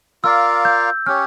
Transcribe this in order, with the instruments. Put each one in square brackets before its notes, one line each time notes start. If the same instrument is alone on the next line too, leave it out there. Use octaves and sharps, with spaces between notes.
[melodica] F4 A#4 D5 F5 [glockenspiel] E6
[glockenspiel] G6
[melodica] C#4 G4 C#5 [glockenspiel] F6